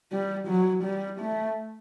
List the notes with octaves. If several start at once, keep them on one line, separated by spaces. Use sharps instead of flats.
G3
F#3
G3
A3